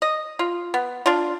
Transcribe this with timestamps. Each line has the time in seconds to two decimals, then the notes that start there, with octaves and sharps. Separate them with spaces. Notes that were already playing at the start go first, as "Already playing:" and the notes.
0.02 D#5
0.39 F4
0.74 B3
1.06 D4 F4